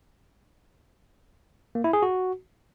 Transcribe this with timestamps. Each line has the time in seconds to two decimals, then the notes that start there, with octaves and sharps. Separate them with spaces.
1.75 A#3
1.84 E4
1.93 G#4
2.03 F#4